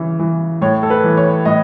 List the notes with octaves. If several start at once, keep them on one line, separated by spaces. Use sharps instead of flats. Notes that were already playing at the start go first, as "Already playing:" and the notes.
Already playing: C#3 E3
E3
A2 C#5
A4
B4
E3
C#5
A2 D#5